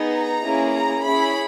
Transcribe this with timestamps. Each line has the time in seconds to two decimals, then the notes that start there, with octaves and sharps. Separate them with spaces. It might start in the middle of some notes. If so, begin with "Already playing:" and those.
Already playing: B3 D#4 G#4
0.14 A#5
0.43 A#3 C#4 E4 G#4
0.74 A#5
1.04 C#4 E4 G#4 B5